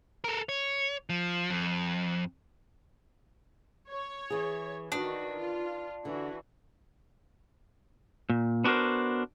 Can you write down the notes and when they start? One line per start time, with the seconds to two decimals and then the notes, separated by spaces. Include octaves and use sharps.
0.24 A4 A#4
0.49 C#5
1.09 F3
1.50 F2
3.89 C#5
4.30 E3 G#4
4.92 D#3 D4 F#4 B4 D#5
5.38 F4
6.05 D3 E3 F#4
8.30 A#2
8.64 B3 D4 F#4 G4 A#4 C5